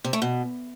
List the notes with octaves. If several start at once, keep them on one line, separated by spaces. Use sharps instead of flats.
C3
A3
B2